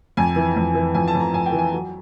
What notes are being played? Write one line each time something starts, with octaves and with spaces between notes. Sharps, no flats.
F2 G#5
E3
F2
E3
F2 G#5
A5
F2
A#5
F2 G#5
G5
E3
G#5
F#3